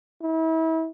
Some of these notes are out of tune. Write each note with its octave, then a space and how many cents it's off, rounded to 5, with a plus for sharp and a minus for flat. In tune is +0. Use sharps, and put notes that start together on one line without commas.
E4 -35